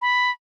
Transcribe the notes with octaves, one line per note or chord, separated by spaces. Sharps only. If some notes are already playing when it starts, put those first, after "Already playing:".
B5